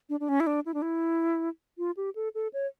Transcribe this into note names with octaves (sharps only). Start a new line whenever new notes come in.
D4
D4
C#4
E4
D4
E4
D4
E4
F4
G4
A4
A4
C#5